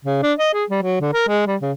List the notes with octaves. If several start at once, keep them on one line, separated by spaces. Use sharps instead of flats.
C#3
D4
D#5
G#4
G3
F#3
D3
A#4
G#3
G3
C#3